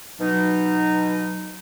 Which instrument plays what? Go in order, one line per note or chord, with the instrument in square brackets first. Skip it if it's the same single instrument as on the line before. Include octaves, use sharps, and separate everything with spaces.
[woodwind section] B2 D#4 [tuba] F#3